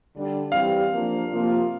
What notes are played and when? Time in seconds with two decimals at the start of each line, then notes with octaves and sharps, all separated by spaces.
0.14 D3 G3 D4
0.52 E3 G3 C4 G4 F5
0.90 F3 A#3 D4
1.29 C3 F3 A#3 F4